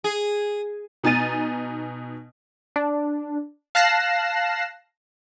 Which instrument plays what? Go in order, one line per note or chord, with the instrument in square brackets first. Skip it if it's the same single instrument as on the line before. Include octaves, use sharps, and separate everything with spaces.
[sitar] G#4
[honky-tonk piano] B2 D#4 G#5 A6 D#7
[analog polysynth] D4
F5 A5 F#6 A#6 C7 E7